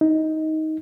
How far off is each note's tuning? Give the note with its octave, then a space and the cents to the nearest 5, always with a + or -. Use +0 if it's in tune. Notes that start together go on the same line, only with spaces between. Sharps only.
D#4 +15